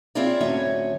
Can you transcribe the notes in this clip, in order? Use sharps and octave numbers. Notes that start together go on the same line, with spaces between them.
C4 E4 F4 G#4 C#5 D5
D2 A2 F#3 C#4 C#5 E5